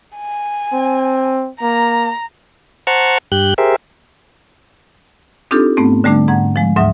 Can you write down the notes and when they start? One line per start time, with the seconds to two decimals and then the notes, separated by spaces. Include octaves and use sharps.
0.17 G#5
0.73 C4
1.62 A#3 A#5
2.87 C5 F#5 A5 A#5 C#6
3.32 G2 G4 F#6 G6
3.58 G4 G#4 A#4 C5 E5
5.51 C4 D4 D#4 F4 G4 A4
5.77 G#2 A3 B3 C4
6.04 D3 G3 A3 D4
6.28 G#2 F#5 A#5 G#6
6.56 F3 G#3
6.76 D2 G#2 F#3 E5 D#6